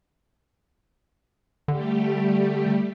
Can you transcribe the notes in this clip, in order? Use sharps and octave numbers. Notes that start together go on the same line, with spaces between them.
D3 G3 A3 G4